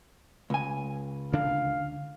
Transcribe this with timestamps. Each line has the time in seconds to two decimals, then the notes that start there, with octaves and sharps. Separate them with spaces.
0.50 C#2 G#5
1.32 D2 D3 D4 F5